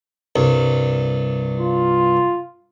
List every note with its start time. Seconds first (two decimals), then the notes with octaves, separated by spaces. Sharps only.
0.36 C2 G2
1.57 F4